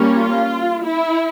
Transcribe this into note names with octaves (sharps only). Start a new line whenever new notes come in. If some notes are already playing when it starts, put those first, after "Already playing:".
Already playing: G3 A#3 C#4
F4
E4